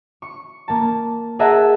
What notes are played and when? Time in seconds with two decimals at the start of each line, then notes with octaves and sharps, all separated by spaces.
0.22 C#6
0.68 A#3 A5
1.39 G#4 A#4 D#5 E5 F#5 A5